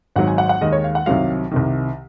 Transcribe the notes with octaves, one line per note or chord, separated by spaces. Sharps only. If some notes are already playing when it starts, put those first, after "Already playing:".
G#1 G#2 F#3 F#5
G#5
F#5
F#5
D#2 D#3 G#3 D#5
C#5
F5
F#5
C2 C3 D#3 F#3 F5
C2 C3 D#3